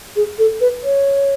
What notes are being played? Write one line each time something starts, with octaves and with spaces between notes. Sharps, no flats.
G#4
A4
B4
C#5